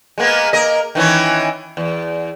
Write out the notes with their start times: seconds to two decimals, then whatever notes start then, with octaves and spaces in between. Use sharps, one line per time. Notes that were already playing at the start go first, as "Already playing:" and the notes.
0.18 G#3 A#3 B3
0.53 A#3 A#4 D#5
0.95 D#3 E3 C#4
1.77 E2